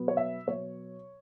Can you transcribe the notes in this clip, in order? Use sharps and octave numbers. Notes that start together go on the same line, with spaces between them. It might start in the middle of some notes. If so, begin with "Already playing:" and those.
Already playing: B2 F#3 B3
C#5
E5
B2 F#3 B3 C#5